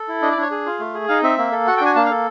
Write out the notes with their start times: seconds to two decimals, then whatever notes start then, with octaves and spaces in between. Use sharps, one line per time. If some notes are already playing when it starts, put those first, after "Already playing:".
Already playing: A4
0.08 E4
0.22 D4 D#5
0.31 D5
0.37 D4 C#5
0.51 G#4
0.66 F4
0.79 A3
0.94 G#4
1.08 D#4 F5
1.23 C4 E5
1.38 A#3
1.52 A4
1.67 F#4 F#5
1.77 G5
1.81 D4 G#5
1.96 A#3 A5
2.05 F5
2.10 A4